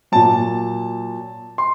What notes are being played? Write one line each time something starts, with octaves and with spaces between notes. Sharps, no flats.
A#2 F#3 A5
C6